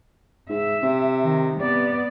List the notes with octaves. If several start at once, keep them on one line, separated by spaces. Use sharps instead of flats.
G#2 E5
C3
D#3
C3 B3 D5